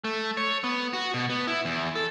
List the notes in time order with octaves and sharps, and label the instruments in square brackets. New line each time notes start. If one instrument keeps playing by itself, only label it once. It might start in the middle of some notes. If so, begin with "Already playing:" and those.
[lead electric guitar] A3
C#5
B3
F#4
B2
B3
E4
E2
A4